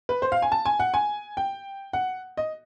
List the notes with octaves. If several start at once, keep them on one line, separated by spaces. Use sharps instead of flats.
B4
C5
F5
G#5
A5
G#5
F#5
G#5
G5
F#5
D#5